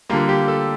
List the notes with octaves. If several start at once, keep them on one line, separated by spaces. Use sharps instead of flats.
D3 G3 A#3 F4
G4
A4